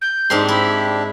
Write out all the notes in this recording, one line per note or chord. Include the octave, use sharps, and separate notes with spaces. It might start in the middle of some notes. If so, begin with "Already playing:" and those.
G6
G#2 C4 D4 G4 C6
E4 B5